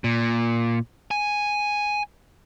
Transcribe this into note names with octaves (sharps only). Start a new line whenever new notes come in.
A#2
G#5